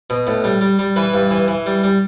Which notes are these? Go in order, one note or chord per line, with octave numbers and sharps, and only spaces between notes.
B2
A2
G3
G3
G3
E3 B4
G2
E3
E3
G3
G3